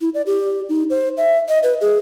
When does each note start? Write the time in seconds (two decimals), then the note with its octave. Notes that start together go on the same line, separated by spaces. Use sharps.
0.01 E4
0.14 D5
0.26 G4
0.69 D#4
0.90 C5
1.17 E5
1.49 D#5
1.63 B4
1.81 G#4